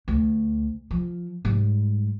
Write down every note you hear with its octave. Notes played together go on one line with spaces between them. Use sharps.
D2
F3
G#2 G3